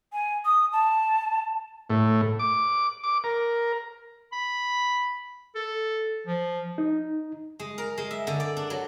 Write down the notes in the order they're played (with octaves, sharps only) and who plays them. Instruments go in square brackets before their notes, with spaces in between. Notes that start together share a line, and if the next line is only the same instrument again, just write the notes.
[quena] G#5
D#6
A5
[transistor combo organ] A2
D6
D6
A#4
[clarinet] B5
A4
F3
[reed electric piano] D#4
[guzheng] G#3
A#4
G#3
E5
D3
D5
D4
F#3